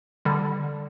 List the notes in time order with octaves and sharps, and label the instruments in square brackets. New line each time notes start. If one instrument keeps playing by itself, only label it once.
[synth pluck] D3 G3